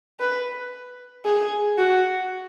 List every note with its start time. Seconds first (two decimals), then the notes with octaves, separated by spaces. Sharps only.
0.20 B4
1.25 G#4
1.78 F#4